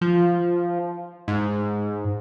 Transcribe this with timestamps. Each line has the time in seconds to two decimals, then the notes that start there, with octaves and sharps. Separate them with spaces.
0.01 F3
1.28 G#2